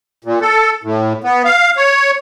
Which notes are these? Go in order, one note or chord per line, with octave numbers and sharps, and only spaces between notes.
A#2
A4
A2
B3
F5
C#5